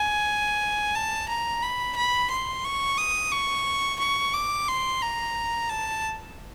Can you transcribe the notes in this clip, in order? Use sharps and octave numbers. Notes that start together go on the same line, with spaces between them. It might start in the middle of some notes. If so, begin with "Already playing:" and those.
Already playing: G#5
A5
A#5
B5
B5
C6
C#6
D#6
C#6
C#6
D6
C6
A#5
A5